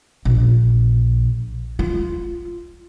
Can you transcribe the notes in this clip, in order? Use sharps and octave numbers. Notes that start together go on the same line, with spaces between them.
A#1
F4